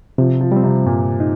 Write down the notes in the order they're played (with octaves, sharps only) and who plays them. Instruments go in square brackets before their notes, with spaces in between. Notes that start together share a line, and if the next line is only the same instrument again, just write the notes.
[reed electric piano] C3 [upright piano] F3
[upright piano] F3
[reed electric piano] G3 C4
[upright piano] C3
[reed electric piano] G2 [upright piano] A#2
[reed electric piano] D#4